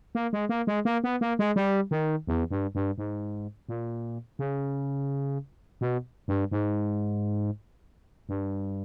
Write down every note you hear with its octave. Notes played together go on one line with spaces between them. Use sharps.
A#3
G#3
A#3
G#3
A#3
B3
A#3
G#3
G3
D#3
E2
G2
G2
G#2
A#2
C#3
B2
G2
G#2
G2